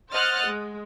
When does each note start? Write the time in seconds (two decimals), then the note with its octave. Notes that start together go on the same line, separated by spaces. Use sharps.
0.12 C5 D#5 F#5 F6 F#6 A6
0.46 G#3